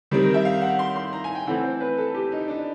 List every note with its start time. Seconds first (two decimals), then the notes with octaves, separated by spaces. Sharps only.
0.11 D#3 G3 C4
0.22 A#4
0.34 E5
0.45 F5
0.62 F#5
0.79 C6
0.96 C6
1.13 A#5
1.24 G#5
1.35 G5
1.47 E3 A3 C4 F#5
1.63 C5
1.80 B4
1.98 A4
2.14 G4
2.32 D#4
2.48 D4